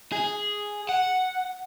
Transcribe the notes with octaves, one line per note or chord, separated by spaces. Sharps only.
G#4
F#5